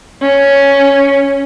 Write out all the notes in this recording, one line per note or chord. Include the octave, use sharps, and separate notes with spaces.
C#4